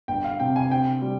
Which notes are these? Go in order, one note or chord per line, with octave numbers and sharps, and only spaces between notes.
G1 G5
F5
C3 G5
G#5
C4 G5
G3